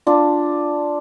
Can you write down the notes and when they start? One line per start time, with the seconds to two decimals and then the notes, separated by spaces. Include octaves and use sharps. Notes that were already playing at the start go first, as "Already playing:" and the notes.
0.07 D4 F4